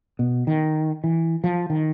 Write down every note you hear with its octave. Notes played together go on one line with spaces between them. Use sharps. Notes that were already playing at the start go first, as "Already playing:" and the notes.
B2
D#3
E3
F3
D#3